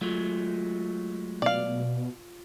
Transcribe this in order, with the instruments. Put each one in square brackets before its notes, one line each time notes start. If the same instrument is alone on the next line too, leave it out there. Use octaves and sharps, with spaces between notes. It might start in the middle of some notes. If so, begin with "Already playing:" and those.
[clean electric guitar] F#3 G#3 A3 [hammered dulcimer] F4
[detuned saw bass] B2 [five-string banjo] D5 F5